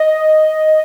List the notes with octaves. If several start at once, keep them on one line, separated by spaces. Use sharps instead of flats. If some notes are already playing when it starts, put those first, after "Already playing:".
Already playing: D#5